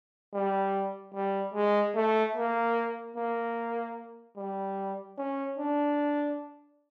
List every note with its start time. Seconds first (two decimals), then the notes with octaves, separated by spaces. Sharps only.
0.33 G3
1.14 G3
1.54 G#3
1.95 A3
2.35 A#3
3.16 A#3
4.37 G3
5.18 C#4
5.58 D4